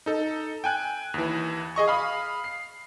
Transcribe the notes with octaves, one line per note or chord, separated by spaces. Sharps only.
D#4 A4
G5 G#5 F#6
D#2 E3
G#4 D#5 C#6
F5 B5 D#6
C7